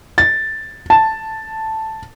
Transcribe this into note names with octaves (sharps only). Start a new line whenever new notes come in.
A6
A5